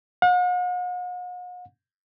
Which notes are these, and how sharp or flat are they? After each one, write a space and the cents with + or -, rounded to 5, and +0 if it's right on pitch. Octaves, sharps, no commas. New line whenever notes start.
F#5 -45